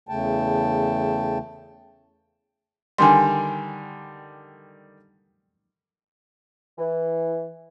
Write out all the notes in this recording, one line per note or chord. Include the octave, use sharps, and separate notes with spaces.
E2 C#3 A3 G5 A5
D3 D#3 G3 G#5 C6
E3